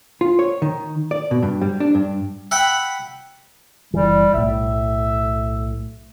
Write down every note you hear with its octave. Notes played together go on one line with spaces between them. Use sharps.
F4
C#5
D#3
D5
B2
G2
G3
D4
G2
E5 F#5 G5 B5
F#1 E3 G3
B1 A2 E5